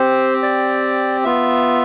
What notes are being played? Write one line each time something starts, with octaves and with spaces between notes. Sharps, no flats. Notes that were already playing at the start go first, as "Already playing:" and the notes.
Already playing: C4 G4 C5
D5
B3 F4 E5